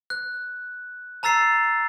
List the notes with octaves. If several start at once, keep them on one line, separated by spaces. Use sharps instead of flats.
F#6
A5 A#5 E6 A6 C7